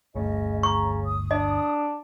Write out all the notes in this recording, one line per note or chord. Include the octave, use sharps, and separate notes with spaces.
G1 D2 C#3 A3 D#5
A#5 C#6
D#6
D4 D#5